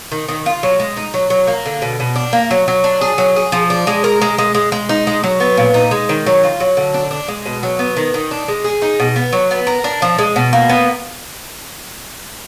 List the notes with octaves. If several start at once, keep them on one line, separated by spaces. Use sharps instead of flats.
D#3
D#3
F4
F#3
G#3
D#4
F#3
F#3
A#3
D3
B2
B2
D4
A#3
F#3
F#3
D4
G#4
F#3
G#4
F3
D4
G#3
A#4
G#3
G#3
G#3
G#3
D#4
G#3
F#3
B3
A#2
D#4
G#3
D#3
F#3
F4
F#3
D3
D4
D4
G#3
B2
F#3
B3
D#3
D#3
D4
G#3
G#4
D#4
B2
B3
F#3
B3
A#4
D4
F3
G#3
B2
A#3
B3